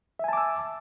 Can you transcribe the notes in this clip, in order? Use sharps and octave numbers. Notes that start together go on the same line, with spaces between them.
E5 G#5 A5 D6 E6